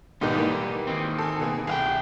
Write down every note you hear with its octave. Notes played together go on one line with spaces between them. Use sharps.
G#2 B2 D#3 G3 D#4 G4
E3 A#3
D#3 C4
A4 G#5
B2 A#3 G#4
C2 G#4 F5 G5